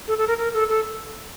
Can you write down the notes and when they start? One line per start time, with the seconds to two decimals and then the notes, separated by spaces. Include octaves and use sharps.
0.08 A4
0.18 A4
0.27 A#4
0.38 A#4
0.54 A4
0.69 A4